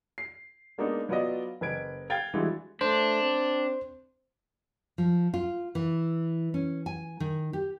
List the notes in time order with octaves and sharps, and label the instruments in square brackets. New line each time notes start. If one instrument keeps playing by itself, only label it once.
[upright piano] C7
G#3 A#3 B3 D4 D#4
F#3 B3 F4 B4 D5 D#5
F#1 B4 G#6 D7
F5 G5 G#6 A6
E3 G3 G#3 D4 E4 F#4
[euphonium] A3 [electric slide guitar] D4 [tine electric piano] C5
[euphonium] C4
[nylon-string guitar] F3
F4
E3
C#4
G#5
D#3
G4